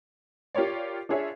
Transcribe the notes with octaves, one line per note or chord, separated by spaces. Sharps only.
F4 G4 A#4 C#5 D5
D4 F4 G#4 C#5 E5